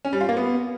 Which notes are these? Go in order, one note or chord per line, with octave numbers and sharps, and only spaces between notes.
C#4
G3
F4
A#3
B3